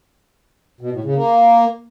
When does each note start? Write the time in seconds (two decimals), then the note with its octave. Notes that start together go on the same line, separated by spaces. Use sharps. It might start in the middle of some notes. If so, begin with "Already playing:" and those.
0.81 B2
0.92 A2
1.04 C#3
1.15 A#3